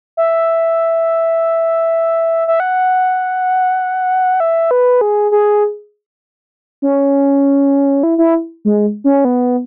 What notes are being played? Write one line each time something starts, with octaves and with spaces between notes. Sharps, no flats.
E5
E5
F#5
E5
B4
G#4
G#4
C#4
E4
E4
G#3
C#4
B3